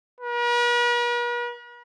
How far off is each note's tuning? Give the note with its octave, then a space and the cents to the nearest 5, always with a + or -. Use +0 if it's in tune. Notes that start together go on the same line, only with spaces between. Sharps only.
B4 -45